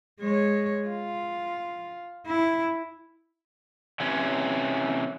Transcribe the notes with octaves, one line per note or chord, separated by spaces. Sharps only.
G#3 C#5
F4
E4
C3 E3 C#4